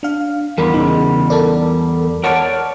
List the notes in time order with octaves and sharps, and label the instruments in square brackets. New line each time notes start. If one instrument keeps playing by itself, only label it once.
[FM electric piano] D4 F5
[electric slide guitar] E2 G3 [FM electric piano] A#4 C6
[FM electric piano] C#3 D#4
A4 A#4 D5
[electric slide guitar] A#4 C#5 D5 [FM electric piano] F#5 A5 F6